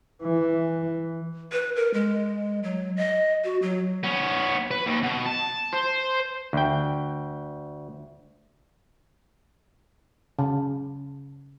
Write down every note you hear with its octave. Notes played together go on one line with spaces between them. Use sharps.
E3
B4
A#4
G#3
F#3
D#5
F#4
F#3
B3 C#4
B4
D#2
B2
A5
C5
D2 G5
C#3